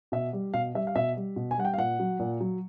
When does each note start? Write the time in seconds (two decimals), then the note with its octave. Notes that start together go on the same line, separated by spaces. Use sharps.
0.12 B2 E5
0.33 G3
0.54 B2 F5
0.75 G3 E5
0.87 F5
0.96 B2 E5
1.17 G3
1.36 B2
1.51 G#5
1.58 G3 F#5
1.65 G5
1.73 F5
1.78 A#2 F#5
2.00 F#3
2.19 A#2
2.41 F#3